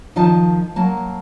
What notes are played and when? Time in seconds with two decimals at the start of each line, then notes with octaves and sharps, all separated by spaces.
0.16 D#3 F3 D#4 D#5 A5
0.76 F#3 A#3 A5